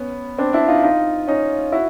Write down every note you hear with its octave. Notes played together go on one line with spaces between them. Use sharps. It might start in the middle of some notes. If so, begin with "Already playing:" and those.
Already playing: B3 C#4
C4 D4
D4 E4
D#4 F4
D#4 F4
C#4 D#4
E4 F#4